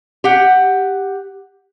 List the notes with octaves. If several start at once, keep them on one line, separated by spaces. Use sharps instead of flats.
G4 F#5